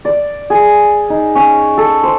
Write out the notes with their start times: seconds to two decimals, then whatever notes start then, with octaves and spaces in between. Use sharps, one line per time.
0.05 D5
0.50 G#4
1.10 D#4
1.35 C#4
1.77 A4
2.03 C5